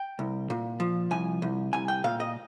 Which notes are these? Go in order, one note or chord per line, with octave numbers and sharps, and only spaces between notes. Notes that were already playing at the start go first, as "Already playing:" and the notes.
Already playing: G5
C2
A#2
F3
C2 G#5
C2
C2 G#5
G5
A#2 F5
D#5